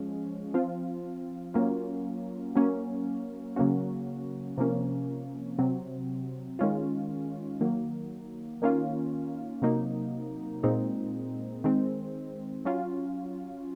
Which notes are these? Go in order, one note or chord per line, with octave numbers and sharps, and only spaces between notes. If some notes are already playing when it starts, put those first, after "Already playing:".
Already playing: F3 G#3 C#4
F3 C4 F4
F#3 A#3 C#4 F4
F#3 A#3 C#4
C#3 F#3 A#3 C#4 F#4
C3 F3 A#3 C#4
C3 F#3 C4
D#3 G#3 C#4 F4
D#3 F#3 A#3
D#3 A#3 C#4 F4
C3 F#3 A#3 D#4
A#2 G#3 C4 D#4
D#3 G#3 C4
F#3 C#4 F4